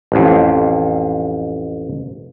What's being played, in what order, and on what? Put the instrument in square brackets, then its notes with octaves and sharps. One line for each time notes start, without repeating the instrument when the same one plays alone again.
[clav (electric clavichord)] A1 F2